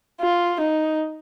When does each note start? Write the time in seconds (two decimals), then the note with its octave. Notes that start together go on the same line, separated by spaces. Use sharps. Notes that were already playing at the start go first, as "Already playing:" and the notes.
0.21 F4
0.60 D#4